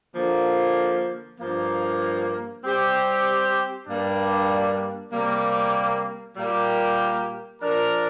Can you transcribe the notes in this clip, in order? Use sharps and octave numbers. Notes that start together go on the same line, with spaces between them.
D3 F3 A#3
G2 F3 A#3
G3 C4 G4 C5
G2 G3 A#3 D4
C3 G3 A#3
A#2 G3 A#3 G4 A#4
F3 D4 A#4